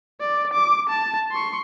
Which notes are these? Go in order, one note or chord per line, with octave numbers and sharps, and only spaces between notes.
D5
D6
A5
C6 C#6